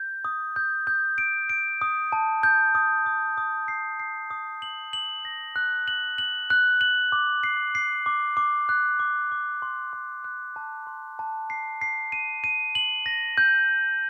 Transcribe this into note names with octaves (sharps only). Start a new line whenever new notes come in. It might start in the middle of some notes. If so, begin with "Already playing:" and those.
Already playing: G6
D#6
G6
G6
D7
D7
D#6
A5
G6
D#6
D#6
D#6
C7
C7
D#6
F#7
F#7
A#6
F#6
F#7
F#7
F#6
F#7
D6
C7
C7
D6
D6
F#6
D6
D6
C6
C6
F#6
A5
C6
A5
C7
C7
D#7
D#7
F#7
A#6
G6